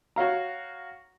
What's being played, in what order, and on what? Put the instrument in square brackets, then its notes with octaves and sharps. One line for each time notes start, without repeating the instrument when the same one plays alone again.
[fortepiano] F#4 C#5 F5 A#5